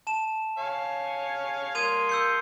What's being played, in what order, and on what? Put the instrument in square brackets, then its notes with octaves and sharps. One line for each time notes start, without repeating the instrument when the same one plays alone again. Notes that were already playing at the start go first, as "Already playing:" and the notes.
[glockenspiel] A5 E7
[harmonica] C#5 F5 G#5
[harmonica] A#3 C6 D#6 [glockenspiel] G#6 D#7 F7
[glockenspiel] E6 G6 C#7